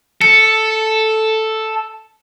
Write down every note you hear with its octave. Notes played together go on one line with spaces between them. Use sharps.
A4 C#7